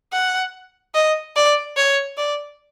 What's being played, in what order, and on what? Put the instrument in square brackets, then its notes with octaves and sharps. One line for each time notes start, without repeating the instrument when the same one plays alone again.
[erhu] F#5
D#5
D5
C#5
D5